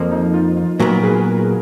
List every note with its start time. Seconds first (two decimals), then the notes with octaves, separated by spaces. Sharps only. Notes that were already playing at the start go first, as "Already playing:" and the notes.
Already playing: F2 F3 A#3 F4
0.11 D#4
0.34 F4
0.57 F4
0.79 A#2 F#3 B3 F#4 A#4
1.03 G#4 B4